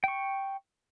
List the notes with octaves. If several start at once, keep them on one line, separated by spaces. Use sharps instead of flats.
G5 C#6